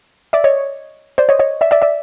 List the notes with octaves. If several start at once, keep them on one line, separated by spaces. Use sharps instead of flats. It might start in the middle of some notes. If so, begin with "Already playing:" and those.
D5 E5
C#5 D#5
C5 D5
C#5 D#5
C#5 D#5
D5 E5
D5 E5
D5 E5